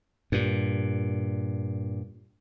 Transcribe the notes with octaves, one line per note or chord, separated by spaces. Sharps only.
G2 A#2